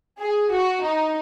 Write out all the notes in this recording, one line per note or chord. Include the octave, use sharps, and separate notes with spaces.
G#4
F#4
D#4